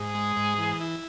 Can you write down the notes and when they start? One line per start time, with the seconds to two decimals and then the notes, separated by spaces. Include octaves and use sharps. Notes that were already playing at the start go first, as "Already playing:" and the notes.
Already playing: G#2 G#4
0.15 G#3
0.36 G#2
0.58 E3
0.81 E4